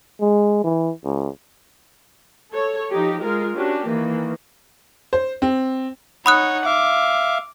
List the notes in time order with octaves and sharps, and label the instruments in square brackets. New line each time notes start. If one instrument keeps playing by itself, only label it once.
[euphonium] G#3
E3
C#2
[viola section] A4 C#5
F3 D#4 G4
G#3 F4 A#4
C#4 D4 F#4 G4
D#3 E3 A#3
[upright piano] C5
C4
[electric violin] D#4 C#5 [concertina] F#5 [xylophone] B5 D#6 F#6
[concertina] E5 F5 [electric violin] D6